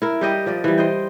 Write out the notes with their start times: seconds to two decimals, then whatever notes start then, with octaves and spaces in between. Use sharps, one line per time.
0.02 E4 A#4
0.21 G3 G4 D#5
0.46 F3 D5 D#5
0.64 E3 G3
0.78 C5 D#5 G5